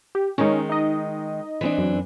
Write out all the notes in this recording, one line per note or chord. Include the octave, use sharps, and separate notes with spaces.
G4
D#3 G#3 C#4 D#4
D#4 D#5
E3 C4 D4
F#2